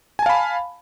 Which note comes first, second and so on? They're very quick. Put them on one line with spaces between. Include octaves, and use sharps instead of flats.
G#5 A5 F5 B5